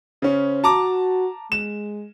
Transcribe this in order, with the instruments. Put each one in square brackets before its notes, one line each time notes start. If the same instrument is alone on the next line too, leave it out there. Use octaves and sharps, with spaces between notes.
[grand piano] C#3 C#4 [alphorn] C5
[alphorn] F#4 [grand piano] A5 A#5 D6
[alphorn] G#3 [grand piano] E7